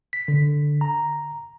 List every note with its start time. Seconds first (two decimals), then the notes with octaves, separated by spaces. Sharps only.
0.13 B6
0.28 D3
0.81 A#5